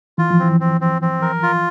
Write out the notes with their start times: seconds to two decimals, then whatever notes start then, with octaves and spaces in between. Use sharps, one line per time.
0.18 E3 F4
0.31 F3
0.39 E3 C4
0.60 C4
0.81 C4
1.02 C4
1.22 A#4
1.43 F4